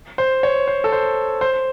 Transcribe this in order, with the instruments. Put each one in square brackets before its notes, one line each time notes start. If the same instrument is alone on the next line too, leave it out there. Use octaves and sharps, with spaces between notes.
[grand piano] C5
C#5
C5
A4
C5
C5